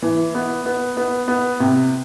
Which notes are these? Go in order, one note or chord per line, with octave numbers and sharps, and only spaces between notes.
E3
B3
B3
B3
B3
C3